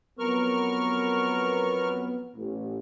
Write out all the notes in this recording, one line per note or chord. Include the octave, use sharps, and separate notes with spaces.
F2 F#3 B3 A#4 C#6 F6
A1